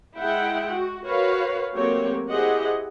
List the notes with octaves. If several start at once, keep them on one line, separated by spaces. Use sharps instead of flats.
G#3 E4 E5 F#5 G5
F#4
F#4 A#4 B4 C#5 F5
F#3 A3 A#3 C4 G4 C#5
E4 G4 G#4 C5 D#5 F#5